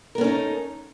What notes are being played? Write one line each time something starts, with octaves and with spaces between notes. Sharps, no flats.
A3 B3 C#4 D#4 A#4